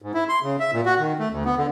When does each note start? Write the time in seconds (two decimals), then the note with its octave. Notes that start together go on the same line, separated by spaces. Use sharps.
0.02 G#2
0.14 E4
0.29 C6
0.43 C#3
0.60 E5
0.73 A#2
0.86 F#4
0.99 D#3
1.19 A3
1.32 D2
1.45 B3
1.57 D3